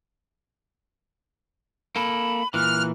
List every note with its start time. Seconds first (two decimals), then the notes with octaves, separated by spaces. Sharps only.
1.96 A#3 A4 B5
2.54 A#2 E3 F6 F#6